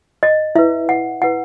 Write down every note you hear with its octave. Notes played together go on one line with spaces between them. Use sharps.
D#5
E4 B4 E5
F#5
E4 B4 F#5